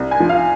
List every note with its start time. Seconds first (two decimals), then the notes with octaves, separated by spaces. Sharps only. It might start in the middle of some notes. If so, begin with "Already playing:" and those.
Already playing: C2
0.11 G#5
0.20 F3
0.29 F5